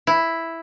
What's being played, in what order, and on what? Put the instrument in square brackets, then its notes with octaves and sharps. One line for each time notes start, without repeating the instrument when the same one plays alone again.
[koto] E4